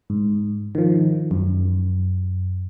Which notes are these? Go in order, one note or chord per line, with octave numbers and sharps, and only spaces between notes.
G#2
D#3 F3
F#2